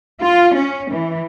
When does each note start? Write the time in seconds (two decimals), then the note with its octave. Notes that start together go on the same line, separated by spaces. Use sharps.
0.20 F4
0.54 C#4
0.91 E3